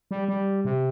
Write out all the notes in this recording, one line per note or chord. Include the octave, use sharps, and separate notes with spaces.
G3
G3
C3